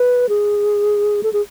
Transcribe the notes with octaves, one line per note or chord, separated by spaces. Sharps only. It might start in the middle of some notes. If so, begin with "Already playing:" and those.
Already playing: B4
G#4
A4
G#4